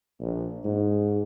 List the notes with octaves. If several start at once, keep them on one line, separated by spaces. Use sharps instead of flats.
A#1
G#2